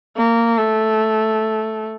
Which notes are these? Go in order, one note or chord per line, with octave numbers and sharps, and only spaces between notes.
A#3
A3